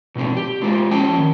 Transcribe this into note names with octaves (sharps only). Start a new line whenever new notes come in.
B2 F3 C4 D4
G4
F#3 G#3 F4 G4 C5
F3 C#4 G5 A5
D#3